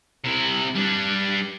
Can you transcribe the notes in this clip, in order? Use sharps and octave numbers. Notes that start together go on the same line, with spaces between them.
C3 E4
G3 D4